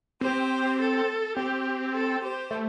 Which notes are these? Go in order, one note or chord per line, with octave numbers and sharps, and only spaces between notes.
C4 G4 C5
A4
C4 G4
A4
G4 C5
A3